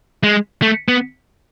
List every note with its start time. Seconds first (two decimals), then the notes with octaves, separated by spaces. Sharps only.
0.23 G#3
0.62 A3
0.88 B3